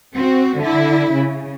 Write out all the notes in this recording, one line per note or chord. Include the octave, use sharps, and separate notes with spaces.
C4 F#4
D3 E4
C#3